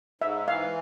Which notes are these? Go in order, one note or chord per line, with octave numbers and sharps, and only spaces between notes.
G#2 E5
E3 F5